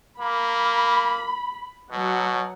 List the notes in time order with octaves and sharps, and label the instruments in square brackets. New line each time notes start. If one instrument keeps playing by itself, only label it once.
[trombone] A#3 [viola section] B5
[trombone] B2 [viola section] F#3 F#5